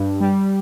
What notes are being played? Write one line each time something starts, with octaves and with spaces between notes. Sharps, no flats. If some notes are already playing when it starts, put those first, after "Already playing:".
Already playing: G2
G3